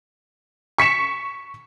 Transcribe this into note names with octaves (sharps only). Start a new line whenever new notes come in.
C#6 B6 C#7 E7